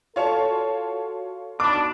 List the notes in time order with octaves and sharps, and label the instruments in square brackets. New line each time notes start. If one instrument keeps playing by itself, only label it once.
[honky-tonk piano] F4 C#5 A5 [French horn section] F#4 A4
[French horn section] D#3 F#4 [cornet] D4 [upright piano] B5 D6